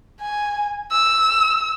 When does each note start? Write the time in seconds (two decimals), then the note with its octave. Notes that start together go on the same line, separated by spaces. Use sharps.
0.21 G#5
0.92 E6